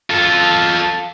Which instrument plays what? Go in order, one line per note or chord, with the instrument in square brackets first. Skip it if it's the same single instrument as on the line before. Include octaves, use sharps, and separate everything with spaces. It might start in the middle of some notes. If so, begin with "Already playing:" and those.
[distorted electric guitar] F4 A4